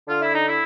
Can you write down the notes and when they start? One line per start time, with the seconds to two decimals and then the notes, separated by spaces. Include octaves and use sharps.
0.08 D3 F4
0.22 E4
0.34 D#4
0.47 E4